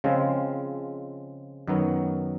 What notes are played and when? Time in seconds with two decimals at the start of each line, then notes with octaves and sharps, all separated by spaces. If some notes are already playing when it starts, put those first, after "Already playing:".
0.04 C#3 F3 G#3 C4 F4
1.68 F#2 D#3 F#3 B3